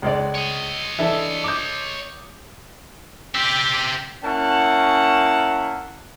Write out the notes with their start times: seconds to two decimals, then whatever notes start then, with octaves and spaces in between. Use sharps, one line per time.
0.02 C#2 G#3 D5
0.35 C#5 D#5
0.99 E3 D4 A4 E5
1.44 D6 D#6 G6
3.35 G4 E5 G5 D6
4.24 A#3 C#4 E4 F#5 A5